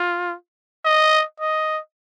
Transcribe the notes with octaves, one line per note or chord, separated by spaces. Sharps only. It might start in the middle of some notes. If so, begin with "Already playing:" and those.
Already playing: F4
D#5
D#5